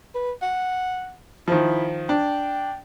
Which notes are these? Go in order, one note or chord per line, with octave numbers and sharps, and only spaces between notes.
B4
F#5
D#3 F3 E4
D4 G5